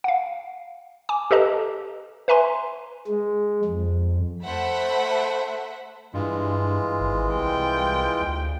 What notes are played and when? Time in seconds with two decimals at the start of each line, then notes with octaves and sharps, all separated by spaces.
0.04 F5 F#5
1.09 G#5 D6
1.31 G4 A4 B4 D#5 A5 A#5
2.28 B4 E5 G#5 A#5 C6
3.08 G#3
3.64 F2
4.44 A3 C5 E5 F#5 B5 B6
6.14 G2 E3 G#3 F4
7.00 G#1
7.35 C2 G5
8.21 D2